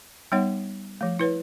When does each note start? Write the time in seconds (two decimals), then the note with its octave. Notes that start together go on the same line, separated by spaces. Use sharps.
0.32 G3 B3 D#4 C#5 F#5
1.01 F3 A3
1.19 E4 B4 C#5